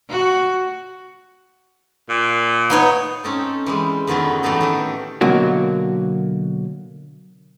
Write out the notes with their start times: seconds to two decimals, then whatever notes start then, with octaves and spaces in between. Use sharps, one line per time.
0.10 F#4
2.09 A#2
2.70 B3 D#4 C#5
3.24 C4 C#4 D#4 A4
3.66 E3 G3 G#3
4.07 F2 D3 D#3 A3 B3 C#4
4.43 A2 E3 F#3 D#4 A4
4.61 D#3 G4 A4
5.21 B2 D3 F#3 A#3 F#4